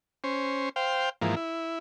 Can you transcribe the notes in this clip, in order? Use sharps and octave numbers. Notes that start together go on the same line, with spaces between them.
C#4 C5
C5 F5 G5
G#2 E3 F3 A#3
E4